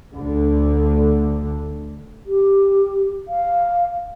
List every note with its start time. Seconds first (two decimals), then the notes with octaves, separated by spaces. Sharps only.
0.13 D2 D3
2.26 G4
3.27 F5